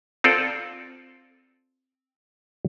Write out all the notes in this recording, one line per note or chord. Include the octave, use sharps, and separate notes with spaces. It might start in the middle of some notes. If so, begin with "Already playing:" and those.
C4 F4 A4 D5 G5